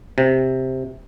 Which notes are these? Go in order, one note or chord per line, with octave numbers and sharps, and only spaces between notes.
C3